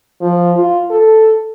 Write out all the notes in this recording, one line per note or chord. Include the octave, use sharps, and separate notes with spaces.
F3
F4
A4